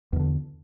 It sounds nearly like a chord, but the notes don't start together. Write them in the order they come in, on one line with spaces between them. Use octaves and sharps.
E2 D#3 D3